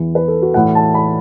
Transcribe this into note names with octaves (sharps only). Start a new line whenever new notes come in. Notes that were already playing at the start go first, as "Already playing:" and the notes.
Already playing: E2 E3
B4
A4
F#4
A2 E3 F#5
A5
B5